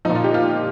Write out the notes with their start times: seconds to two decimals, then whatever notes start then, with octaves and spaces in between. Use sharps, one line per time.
0.05 A#2 F3 D#4
0.15 F4
0.24 G4
0.34 F4